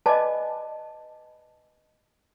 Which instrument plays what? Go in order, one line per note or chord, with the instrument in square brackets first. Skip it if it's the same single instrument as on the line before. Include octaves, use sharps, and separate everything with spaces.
[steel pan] B4 D5 G#5 [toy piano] D#5 A5